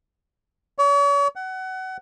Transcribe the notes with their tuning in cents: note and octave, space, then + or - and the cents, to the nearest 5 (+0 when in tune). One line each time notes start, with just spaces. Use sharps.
C#5 +40
F#5 +25